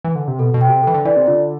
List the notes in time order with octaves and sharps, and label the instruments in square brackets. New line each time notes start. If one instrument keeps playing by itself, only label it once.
[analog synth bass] E3
D3
C3
[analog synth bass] B2 [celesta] A4
[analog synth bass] B2
[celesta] G5
[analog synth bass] C3
[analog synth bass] E3 [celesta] A4
[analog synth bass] D3
[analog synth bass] E3 [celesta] D5
[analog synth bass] C3
[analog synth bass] D3 [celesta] F4